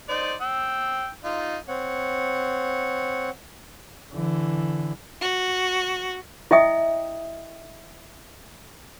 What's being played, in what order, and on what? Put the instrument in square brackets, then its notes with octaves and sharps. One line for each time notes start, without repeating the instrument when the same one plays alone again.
[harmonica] D#4 C5 D5
G5 E6
D#4 F4
[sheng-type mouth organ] C4 C#5 F#5
[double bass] D3 E3
[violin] F#4
[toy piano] E4 D#5 E5 G5 D#6